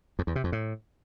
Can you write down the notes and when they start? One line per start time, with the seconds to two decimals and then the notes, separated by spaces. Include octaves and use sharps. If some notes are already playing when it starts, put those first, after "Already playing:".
0.19 F2
0.27 E2
0.36 C3
0.44 F2
0.52 A2